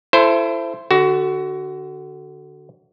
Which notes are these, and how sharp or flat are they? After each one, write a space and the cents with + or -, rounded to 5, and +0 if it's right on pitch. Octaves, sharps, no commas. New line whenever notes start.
E4 +30 A4 +0 C5 +0
D3 +0 F#4 +20